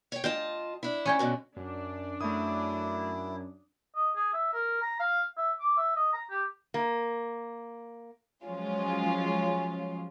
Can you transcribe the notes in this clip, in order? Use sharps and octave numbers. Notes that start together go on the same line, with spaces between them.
C#5 G5
F4 D#5 G5 A5
D4 E4
C#4 C#5 G5
B2 D3 F#3
F#2 D4
F#2 A3 E4 D#6
D#5
G#4
E5
A#4
A#5
F5
E5
D6
E5
D#5
A#5
G4
A#3
F3 F#3 G#3 C#4 F4